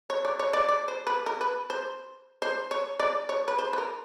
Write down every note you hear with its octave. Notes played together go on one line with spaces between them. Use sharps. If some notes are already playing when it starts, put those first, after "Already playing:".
C#5
D5
C#5
D5
D5
C5
B4
A#4
B4
C5
C5
C#5
D5
C#5
B4
C5
B4
A#4